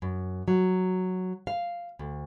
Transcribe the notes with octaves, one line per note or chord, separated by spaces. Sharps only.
F#2
F#3
F5
D2